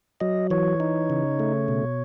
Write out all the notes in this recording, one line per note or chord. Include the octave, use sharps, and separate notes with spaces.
F#3 D#5
E3 C#5
D#4
C#3
A3
B2